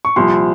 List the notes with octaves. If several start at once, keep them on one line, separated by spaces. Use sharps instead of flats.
C#6
C2 A#2 F3 C6